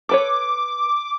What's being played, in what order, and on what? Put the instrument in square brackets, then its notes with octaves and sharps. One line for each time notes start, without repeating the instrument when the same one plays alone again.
[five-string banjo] A4 B4 C#5 [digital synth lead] D6